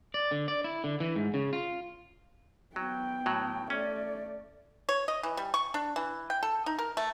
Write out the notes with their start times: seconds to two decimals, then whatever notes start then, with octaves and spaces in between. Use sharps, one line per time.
0.14 D5
0.31 D3
0.48 D5
0.64 E4
0.84 D3
1.00 E3
1.15 G#2
1.34 C#3
1.53 F4
2.76 F#3 B3 G5
3.26 A2 F#3
3.70 A3 C#4 D5
4.89 C#5
5.08 D#5
5.23 E3
5.37 G3
5.54 C#6
5.74 D4
5.96 E3
6.30 G5
6.43 A4
6.66 D#4
6.79 A#4
6.97 A3